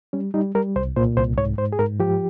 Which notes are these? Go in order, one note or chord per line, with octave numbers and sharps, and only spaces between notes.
G3 C#4
G3 D#4
G3 A#4
C2 C5
A#2 C5
C2 C5
G#2 C#5
G#2 C5
G#4
G#2 A#4
F3 G4